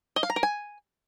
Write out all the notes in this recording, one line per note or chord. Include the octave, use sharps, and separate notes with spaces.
D#5
F5
A#5
A#4
G#5